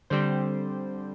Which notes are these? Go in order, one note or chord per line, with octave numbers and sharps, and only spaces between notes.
D3 G3 C4 C5